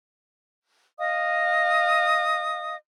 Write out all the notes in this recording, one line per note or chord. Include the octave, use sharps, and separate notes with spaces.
D#5 F5 D#6